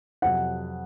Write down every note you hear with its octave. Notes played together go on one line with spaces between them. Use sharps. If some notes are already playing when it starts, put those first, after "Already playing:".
F2 C3 F#3 F#5